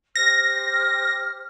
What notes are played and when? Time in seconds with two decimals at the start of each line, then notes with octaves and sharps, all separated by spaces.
0.16 G4 C5 F6 A#6